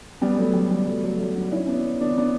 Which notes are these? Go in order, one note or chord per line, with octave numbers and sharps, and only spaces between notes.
G3 B3
F#3 A3
G3
G3
F#3 A3
F#3 A3
F#3 A3
D4 F#4
C#4 E4
B3 D4
B3 D4
B3 D4